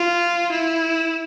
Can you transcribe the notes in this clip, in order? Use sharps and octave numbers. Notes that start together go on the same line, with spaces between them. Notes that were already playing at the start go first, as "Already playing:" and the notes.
Already playing: F4
E4